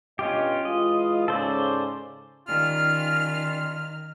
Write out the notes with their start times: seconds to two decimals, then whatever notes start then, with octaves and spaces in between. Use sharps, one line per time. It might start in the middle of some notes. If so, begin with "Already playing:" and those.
0.19 G2 B2 C#4 F4 G4 D#5
0.65 E3 G#3 F4 D#5
1.28 G#2 C#3 A4 C5 D5
2.47 D#3 G3 C#4 F4 F6